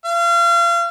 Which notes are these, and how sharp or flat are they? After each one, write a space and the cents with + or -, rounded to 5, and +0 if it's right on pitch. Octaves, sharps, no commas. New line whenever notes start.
F5 -35